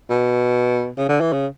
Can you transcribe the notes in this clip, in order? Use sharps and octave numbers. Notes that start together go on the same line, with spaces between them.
B2
C#3
D3
E3
C#3